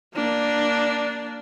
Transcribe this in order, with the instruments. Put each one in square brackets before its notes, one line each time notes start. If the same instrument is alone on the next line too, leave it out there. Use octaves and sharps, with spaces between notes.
[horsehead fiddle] A#3 D4